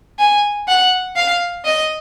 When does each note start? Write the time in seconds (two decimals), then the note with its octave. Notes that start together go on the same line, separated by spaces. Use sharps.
0.19 G#5
0.68 F#5
1.16 F5
1.64 D#5